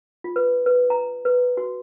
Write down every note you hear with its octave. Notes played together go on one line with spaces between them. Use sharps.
F4
B4
B4
A#5
B4
F#4